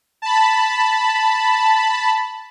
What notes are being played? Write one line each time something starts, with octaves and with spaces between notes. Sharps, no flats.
A5 B5